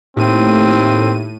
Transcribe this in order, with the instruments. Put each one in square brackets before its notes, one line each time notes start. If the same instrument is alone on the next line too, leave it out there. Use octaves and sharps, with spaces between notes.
[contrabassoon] D#2 [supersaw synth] A2 D#7 [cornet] C4